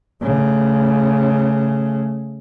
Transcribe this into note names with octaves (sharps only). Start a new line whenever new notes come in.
C#3 A3